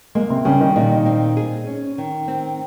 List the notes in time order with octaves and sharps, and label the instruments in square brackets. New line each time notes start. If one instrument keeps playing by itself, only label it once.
[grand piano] G#3 [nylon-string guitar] A#3
[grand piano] C3 C4
[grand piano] C#3 C#4 [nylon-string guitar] G3
[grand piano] D#3 D#4
[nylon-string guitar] A#2 [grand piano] D#3 D#4
[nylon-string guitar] C4
G#4
C#4
D#3
C4